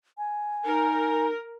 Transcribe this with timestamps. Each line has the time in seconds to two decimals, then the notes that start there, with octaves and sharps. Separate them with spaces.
0.18 G#5
0.65 D#4 A#4